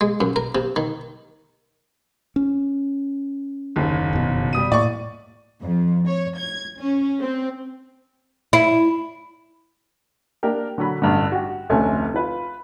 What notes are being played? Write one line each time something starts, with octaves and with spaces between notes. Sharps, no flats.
G#3
F#2
A#4
C3
D#3
C#4
F#1 D#2
F1 B2
G3 D#6 D#7
A2 A#3 D5 C#6
F2
C#5
G#6
C#4
C4
E4
A#3 D4 G4 A#4
D3 F#3 B5
A1 G2 D3
F#4 G4
F1 D2 A3 C#4 A4 G#5
F4 B4